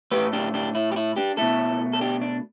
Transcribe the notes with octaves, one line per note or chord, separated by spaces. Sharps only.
A2 A3 G4 B4
D4 G4
D4 G4
E4
G4
E4
D4 G4
B2 A3 E4 A4
A4
D4 G4
D4